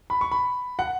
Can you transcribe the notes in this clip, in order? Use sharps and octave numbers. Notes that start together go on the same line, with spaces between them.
B5
C#6
B5
F#5